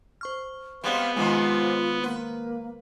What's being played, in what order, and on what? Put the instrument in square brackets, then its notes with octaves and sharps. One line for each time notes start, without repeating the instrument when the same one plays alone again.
[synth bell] C5 C#6 F6
[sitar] G3 G#3 C4 [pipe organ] B3 [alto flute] F5
[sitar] G#2 C3 F3 [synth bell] D#3 G#3 [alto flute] F4
[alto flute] A#3 [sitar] B4